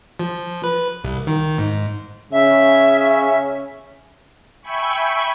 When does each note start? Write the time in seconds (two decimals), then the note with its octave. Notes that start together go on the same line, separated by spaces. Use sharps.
0.19 F3
0.64 B4
1.04 C2
1.27 D#3
1.58 G#2
2.32 C#3 C#4 E5
4.61 E5 G5 G#5 B5 C#6